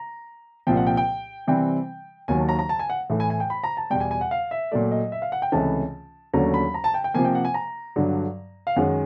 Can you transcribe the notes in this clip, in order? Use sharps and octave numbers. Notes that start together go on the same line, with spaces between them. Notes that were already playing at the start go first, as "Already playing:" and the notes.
Already playing: A#5
C2 A#2 F3 G5
F#5
G5
G5
C3 E3 G3 C4 G5
D#2 D#3 F#3 G#5
A5
A#5
A#5
A5
G#5
F#5
A2 E3 A3
G#5
G#5
G5
B5
A#5
A5
E2 B2 G3 G5
G#5
G#5
F#5
F5
E5
A#2 F#3 A3 D5
D#5
E5
F5
F#5
G5
C#2 C3 E3 A3 C#4 A5
D#2 D3 F#3 A3 C#4 A#5
B5
A#5
A5
G5
G5
C3 F3 A#3 G#5
G5
F#5
G#5
A#5
G2 D3 F#3
F5
F#2 D#3 G#3 C#4 F#5